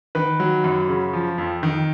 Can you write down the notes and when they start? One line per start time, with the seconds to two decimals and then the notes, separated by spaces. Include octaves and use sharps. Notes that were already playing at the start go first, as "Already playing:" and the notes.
0.15 D#3 B4
0.40 F#3
0.64 F#2
0.89 C#3
1.13 F3
1.38 F2
1.63 D#3